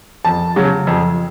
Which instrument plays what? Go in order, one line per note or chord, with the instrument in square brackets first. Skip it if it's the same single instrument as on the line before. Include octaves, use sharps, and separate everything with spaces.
[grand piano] F2 A5
C#3 F#3
F2